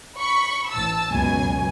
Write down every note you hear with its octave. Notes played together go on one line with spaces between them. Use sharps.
B5 C#6
A1 A5 E6
C#2 F#2 B2 G#5